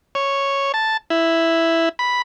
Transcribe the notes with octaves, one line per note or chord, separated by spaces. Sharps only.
C#5
A5
E4
B5